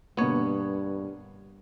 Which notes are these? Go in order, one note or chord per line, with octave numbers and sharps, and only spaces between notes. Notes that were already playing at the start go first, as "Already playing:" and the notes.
G2 B2 D3 A#3 B3 C#5